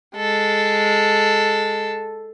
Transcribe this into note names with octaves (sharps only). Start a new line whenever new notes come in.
G#3 A4